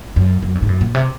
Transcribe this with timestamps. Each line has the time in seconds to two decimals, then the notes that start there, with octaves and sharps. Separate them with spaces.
0.16 F#2
0.42 F#2
0.55 F2
0.62 G#2
0.69 F#2
0.81 A#2
0.95 C3